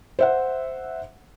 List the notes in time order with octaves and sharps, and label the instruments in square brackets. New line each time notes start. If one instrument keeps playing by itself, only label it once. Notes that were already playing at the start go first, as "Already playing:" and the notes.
[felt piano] C5 E5 F#5